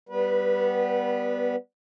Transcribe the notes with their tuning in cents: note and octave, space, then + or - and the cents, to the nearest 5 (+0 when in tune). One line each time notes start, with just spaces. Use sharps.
G3 +0 B3 +0 B4 -25